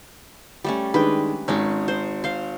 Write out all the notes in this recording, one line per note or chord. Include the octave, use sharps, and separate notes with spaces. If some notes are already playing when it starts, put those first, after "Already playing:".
G3 A3 C#4
D#3 G#3 D4 B4 G5
G#1 G#3 C#4 D#4
C5
C5 F5